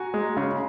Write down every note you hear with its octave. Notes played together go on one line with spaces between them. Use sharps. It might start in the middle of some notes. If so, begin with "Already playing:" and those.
Already playing: F#4 G#5 A#5
G#3
C#3